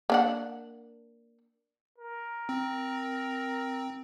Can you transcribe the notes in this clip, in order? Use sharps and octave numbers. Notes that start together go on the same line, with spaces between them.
A#3 D4 F#5
A#4
C4